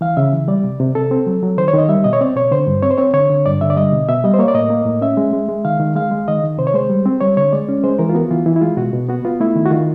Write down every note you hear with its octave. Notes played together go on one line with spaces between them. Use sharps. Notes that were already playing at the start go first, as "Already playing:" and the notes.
E3 F5
C#3 E5
E3
G3 D5
C3
C3
C3 A4
C4
F#3
F#3
D#3 C5
C#5
D#3 D#5
G3 E5
B2 D#5
C#5
C4 D5
B2 C#5
D3 C5
G2
C4 C#5
C5
C4 C#5
D3 C#5
D3
G2 D5
D3 E5
D5
G3 D#5
B2
B2 E5
G3 D#5
C5
A#3 C#5
D5
A2 D#5
A#3
A2
C#4 E5
G#3
G#3
G#3
D#3 F5
D#3
G#3 F5
G#3
D#3 D#5
D#3
C3 C5
C#5
G#3 C5
G3
C4
G3 C#5
D3 C#5
G#3 D5
C#4
G#3 C5
E3 A#4
F4
B3 F#4
E3 F4
E3 E4
E4
G#3 F4
B2 F#4
B2
B3 F#4
B3 F4
A3 E4
D#3
F#4
D#3 F4